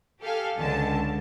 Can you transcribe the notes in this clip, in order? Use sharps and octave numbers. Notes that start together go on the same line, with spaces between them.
G4 A4 F5 G#5
C#2 D3 A5